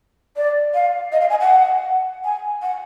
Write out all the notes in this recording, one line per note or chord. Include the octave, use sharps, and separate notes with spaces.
D5
F5
D#5
F5
G#5
F#5
G#5
F#5